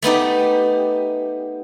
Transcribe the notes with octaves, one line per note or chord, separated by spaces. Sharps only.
A3 B3 D#4 G4